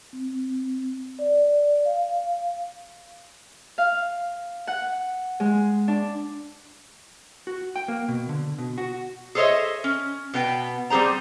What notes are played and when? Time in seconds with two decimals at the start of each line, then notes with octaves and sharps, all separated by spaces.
0.13 C4
1.19 D5
1.85 F5
3.78 F5
4.67 F#5
5.40 G#3
5.88 D4
7.47 F#4
7.76 G5
7.88 A#3
8.08 B2
8.29 D3
8.58 B2
8.78 F#4
9.35 G#4 A4 C5 C#5 D#5 E5
9.84 C#4
10.34 B2 B3 G5
10.90 G3 C4 G#4 C5 A#5